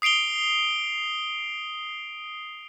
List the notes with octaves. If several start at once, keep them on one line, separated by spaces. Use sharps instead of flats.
D#6 C7 D7 F7 G7